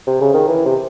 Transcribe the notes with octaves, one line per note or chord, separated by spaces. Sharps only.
C3
C#3
D#3
E3
C3